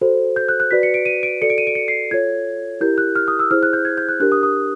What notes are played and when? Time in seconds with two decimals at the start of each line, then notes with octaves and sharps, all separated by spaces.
0.01 F#4 A4 C5
0.36 G6
0.49 F#6
0.60 F#6
0.71 F#4 B4 D5 B6
0.83 C#7
0.94 D7
1.06 D#7
1.23 D7
1.41 F#4 A4 D5 C#7
1.50 D7
1.58 D#7
1.67 D7
1.75 C#7
1.88 C7
2.11 F4 A4 C#5 G#6
2.81 E4 G4 A#4 G6
2.98 F#6
3.16 F6
3.28 D#6
3.39 E6
3.51 E4 G#4 C5 F6
3.63 F#6
3.73 G6
3.85 G#6
3.98 G6
4.09 F#6
4.20 D4 G4 A#4 F#6
4.32 D#6
4.43 D#6